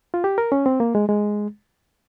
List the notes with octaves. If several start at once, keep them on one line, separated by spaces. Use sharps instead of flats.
F4
G4
A#4
C#4
C4
A#3
G#3
G#3